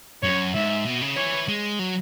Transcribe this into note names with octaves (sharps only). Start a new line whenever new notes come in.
F#2 C#5
G#2 E5
B2
C#3
E3 C#5
G#3
F#3